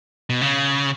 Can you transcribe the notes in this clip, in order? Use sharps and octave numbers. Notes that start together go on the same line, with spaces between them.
B2
C#3